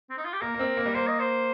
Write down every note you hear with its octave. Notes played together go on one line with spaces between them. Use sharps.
C4
D#4
F4
G4
A#3 A#4
A#3
C4
A#3
G3
A#3 C5
D#5
C5